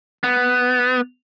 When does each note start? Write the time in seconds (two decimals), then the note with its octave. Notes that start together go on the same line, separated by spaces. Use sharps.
0.24 B3